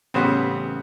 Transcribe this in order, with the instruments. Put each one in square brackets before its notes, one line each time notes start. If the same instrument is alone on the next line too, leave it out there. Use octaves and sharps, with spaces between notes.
[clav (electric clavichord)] A1 C#3 C5 [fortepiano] G3 B3 C4